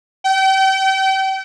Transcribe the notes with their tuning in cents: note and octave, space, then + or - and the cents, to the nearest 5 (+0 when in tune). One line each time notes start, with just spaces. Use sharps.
G5 -35